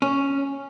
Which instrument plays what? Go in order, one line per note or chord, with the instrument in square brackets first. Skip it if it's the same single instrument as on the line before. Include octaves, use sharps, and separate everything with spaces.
[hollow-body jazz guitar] C#4